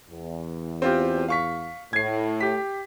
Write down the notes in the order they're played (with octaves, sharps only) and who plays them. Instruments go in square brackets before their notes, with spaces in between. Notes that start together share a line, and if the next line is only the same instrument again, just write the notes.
[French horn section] E2
[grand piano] C4 F4 G4
F5 C#6 B6
[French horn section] A2 [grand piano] G#6 C7
[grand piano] G4 B6